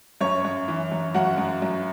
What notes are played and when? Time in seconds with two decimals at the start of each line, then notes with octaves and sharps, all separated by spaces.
0.21 F#2 C#4 C#5
0.45 F#2
0.68 E3
0.91 F#2
1.14 F#2 F#4 F#5
1.38 F#2
1.62 F#2